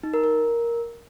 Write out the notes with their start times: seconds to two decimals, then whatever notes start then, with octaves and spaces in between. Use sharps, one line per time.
0.03 D#4
0.14 A#4
0.24 A#4